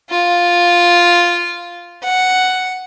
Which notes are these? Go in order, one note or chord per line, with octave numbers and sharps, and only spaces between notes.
F4
F#5